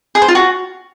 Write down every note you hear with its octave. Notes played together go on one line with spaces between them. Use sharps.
G#4
C5
F4
F#4